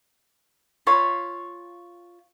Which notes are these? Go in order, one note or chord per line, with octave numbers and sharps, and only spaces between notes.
F4 C#5 B5